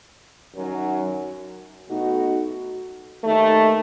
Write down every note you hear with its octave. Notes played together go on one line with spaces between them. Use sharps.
F#2 D#3 F#3
B2 A3 D#4 F#4
D#2 D#3 A3